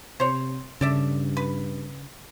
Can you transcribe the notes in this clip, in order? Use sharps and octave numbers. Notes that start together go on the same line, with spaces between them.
C3 C5 C#5
G2 C#3 A4 D5 E5
B4